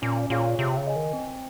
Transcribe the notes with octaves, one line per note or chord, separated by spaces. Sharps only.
A#2 C#4
A#2 F4 G#4 C#5 F5
C3 G#4
C#3
D#5 G#5
D#3
C4